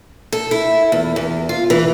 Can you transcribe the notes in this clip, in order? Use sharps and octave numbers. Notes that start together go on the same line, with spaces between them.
A4
E4
E2
E2
F4
E3